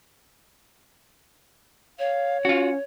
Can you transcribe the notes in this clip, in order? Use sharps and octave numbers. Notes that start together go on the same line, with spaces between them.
C#5 F5
C#4 F4 F#4